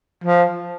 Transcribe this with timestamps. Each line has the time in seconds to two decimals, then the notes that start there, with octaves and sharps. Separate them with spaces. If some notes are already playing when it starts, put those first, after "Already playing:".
0.24 F3